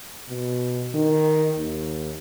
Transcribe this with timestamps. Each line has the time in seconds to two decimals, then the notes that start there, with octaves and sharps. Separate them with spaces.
0.29 B2
0.94 D#3
1.58 D#2